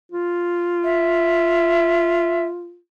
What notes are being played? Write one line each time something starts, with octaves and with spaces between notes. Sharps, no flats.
F4
E5